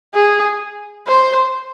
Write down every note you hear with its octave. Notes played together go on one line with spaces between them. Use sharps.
G#4
C5